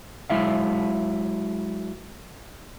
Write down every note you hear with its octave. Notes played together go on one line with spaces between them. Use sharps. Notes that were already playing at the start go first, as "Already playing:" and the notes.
F#3 G#3 E4 E5 F5